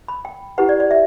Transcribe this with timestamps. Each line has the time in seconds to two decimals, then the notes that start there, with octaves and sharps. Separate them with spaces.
0.08 B5
0.25 G5
0.58 E4 G4 B4 F#5
0.69 D5
0.80 D5
0.91 E5